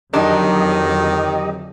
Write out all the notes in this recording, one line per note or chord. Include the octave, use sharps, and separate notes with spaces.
F2 D3 D#3 F#3 D4 D#4 G4 D#5